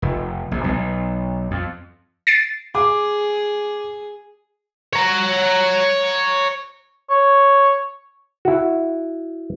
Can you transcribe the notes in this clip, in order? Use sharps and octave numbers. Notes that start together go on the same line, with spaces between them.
F1
A#1
B1
F2
A6 C7 D7
G#4 D6
C#5 A#5
C#5
E4 F#4